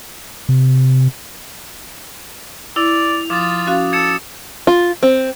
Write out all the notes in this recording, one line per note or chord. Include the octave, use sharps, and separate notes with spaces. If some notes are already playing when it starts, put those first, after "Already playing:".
C3
E4 D5 F7
F3 F4 D6 D#6 A6
C#4 F#4 F5
A4 G#6 C#7 E7
F4
C4